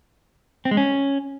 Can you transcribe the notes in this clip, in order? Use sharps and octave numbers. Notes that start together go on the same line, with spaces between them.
C4
G#3
C#4